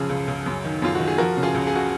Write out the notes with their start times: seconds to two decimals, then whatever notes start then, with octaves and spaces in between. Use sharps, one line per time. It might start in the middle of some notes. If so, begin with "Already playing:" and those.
Already playing: F#2 C#3 F3 G#4
0.09 C#2
0.28 C#2
0.46 F#2
0.64 D#3
0.82 F#2 F4
0.95 D#3 F#4
1.08 G#4
1.18 F3 F#4 A#4
1.37 C#3
1.43 F4 G#4
1.54 C#2
1.67 G#4
1.76 F#4